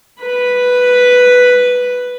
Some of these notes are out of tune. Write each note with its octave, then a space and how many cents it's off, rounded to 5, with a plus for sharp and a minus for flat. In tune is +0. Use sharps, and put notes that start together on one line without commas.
B4 +0 B5 +0